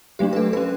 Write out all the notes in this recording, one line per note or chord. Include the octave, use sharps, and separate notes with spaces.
F#3 A3 D4 G4
B4
A4
F#3 C#4 B4